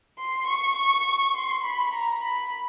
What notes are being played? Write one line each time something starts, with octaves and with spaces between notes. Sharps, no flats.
C6
C#6
C6
B5
A#5
B5